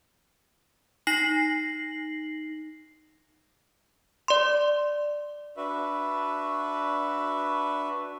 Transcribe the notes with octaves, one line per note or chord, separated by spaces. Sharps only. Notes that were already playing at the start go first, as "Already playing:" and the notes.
D#4 A#6 C7 F#7
D5 C6
D4 F#4 B4 E5